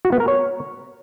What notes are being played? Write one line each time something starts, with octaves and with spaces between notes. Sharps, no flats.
F#4
B3
A#4
C#5